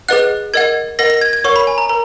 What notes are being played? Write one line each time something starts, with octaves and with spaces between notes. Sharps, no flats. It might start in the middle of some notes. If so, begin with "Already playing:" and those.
G#4 B4 D#5 F#5 F#6
A#4 D#5 F#5 G#6
A#4 D#5 F#5 A#6
A#6
G#6
G#6
A#4 C#5 F#5 C#6
B5
G#5
A#5
A#4 A#5